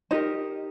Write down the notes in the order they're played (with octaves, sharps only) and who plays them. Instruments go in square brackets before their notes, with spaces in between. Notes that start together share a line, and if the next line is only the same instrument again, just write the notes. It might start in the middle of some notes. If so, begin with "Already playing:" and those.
[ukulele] D#4 G4 A#4 C5 D#5